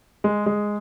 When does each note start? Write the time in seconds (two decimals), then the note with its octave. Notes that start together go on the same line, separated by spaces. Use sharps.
0.24 G#3 G#4
0.46 G#3